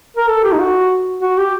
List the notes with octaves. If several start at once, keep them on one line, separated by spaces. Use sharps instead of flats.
A#4
A4
G4
D#4
F#4
F#4
G4